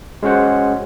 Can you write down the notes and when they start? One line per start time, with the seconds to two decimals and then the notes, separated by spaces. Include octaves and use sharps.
0.23 G#3 C#4 F#4 C5 F#5